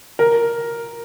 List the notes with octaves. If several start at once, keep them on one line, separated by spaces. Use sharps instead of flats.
A#4